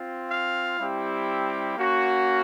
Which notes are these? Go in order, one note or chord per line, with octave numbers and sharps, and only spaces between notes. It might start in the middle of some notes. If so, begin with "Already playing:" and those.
Already playing: C4 F4
F5
G3 C4 E4 G4
A#3 C#4 F#4